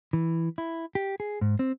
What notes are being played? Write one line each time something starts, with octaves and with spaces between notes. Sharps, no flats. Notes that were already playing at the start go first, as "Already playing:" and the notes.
E3
E4
G4
G#4
G#2
C4